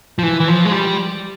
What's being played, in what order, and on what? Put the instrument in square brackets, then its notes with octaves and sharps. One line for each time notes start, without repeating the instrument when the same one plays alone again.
[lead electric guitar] F3
E3
E3
F3
G#3
G3